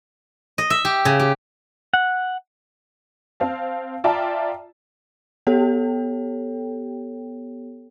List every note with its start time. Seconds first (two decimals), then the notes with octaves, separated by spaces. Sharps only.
0.58 D#5
0.70 E5
0.85 G4
1.05 C#3
1.20 G4
1.94 F#5
3.40 C4 F5 A5
4.04 F4 D5 E5 G5 A5 A#5
5.47 B3 G4 A4 C#5 G5